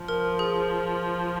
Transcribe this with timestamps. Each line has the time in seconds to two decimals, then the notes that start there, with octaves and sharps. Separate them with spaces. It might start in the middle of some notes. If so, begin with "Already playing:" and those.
Already playing: F3
0.08 A#4
0.39 G#4